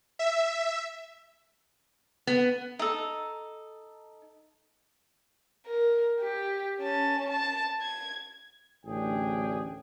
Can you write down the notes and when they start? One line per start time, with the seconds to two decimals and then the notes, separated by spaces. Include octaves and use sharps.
0.19 E5
2.27 B3
2.79 D#4 A4
5.67 A#4
6.20 G4
6.80 C#4 A5
7.30 A5
7.82 G#6
8.86 A1 D2 D4 G#4 G5